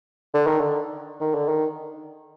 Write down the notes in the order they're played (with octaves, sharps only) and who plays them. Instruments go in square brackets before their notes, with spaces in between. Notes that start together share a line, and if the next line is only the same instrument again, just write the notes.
[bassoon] D3
D#3
D3
D#3
D3
D#3